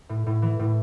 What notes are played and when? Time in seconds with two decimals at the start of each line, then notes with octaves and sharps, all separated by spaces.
0.09 A2
0.26 A2
0.42 E3
0.59 A2